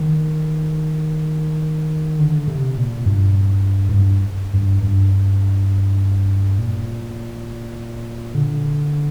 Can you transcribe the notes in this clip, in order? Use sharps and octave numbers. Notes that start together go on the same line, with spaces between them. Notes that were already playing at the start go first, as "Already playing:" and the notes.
Already playing: D#3
D3
C3
A#2
G2
G#2
G2
G2
G2
A#2
D3